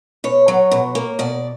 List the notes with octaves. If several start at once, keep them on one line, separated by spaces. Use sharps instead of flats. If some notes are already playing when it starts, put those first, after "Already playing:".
B2 C#5
F#3
B2
A#3
B2 D5